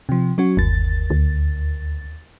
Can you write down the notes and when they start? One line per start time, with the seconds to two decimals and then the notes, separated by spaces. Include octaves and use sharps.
0.09 C3 F3
0.38 F#3 C#4 F#4
0.57 G1 D#2 A6
1.10 D2